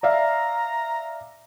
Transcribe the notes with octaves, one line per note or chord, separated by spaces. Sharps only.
D5 E5 F5 A#5